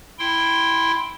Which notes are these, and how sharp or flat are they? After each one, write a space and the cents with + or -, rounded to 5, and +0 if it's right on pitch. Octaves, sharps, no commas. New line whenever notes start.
E4 +0 G5 +0 C6 +0